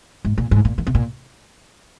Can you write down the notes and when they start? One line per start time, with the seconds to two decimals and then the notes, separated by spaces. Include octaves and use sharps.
0.25 G#2
0.38 A#2
0.51 G#2
0.65 A#2
0.78 D#3
0.87 C3
0.95 A#2